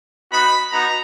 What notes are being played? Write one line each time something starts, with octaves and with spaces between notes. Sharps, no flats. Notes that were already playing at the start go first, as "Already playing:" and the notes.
B3 D#4 F#4 B5
B3 D#4 F#4 A#5